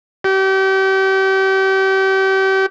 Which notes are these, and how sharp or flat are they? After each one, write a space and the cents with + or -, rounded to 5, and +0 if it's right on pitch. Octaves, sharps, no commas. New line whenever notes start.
G4 -35